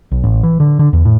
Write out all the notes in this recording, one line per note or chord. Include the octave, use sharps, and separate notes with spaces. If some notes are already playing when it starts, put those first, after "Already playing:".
B1
A1
E3
D3
D3
E2
A2